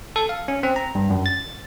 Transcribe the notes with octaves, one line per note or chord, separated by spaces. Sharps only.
A4
F5
C#4
C4
A#5
G2
F#2
A6